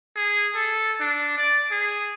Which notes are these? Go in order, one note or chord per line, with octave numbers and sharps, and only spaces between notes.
G#4
A4
D4
D5
G#4